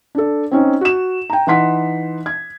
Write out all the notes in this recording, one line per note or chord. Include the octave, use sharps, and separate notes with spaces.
D4 A4
C4 C#4 D#4
F#4 E7
G5 A#5
E3 D#4 F#5 C6 B6
G#6